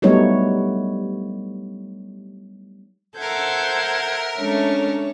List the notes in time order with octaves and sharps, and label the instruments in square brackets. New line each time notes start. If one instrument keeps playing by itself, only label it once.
[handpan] F#3 G3 A3 B3 D#4 C#5
[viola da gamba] A4 C5 [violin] A#4 E5 [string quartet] F#5 G6 G#6
[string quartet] G#3 A3 [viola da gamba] C#4 D4 C#5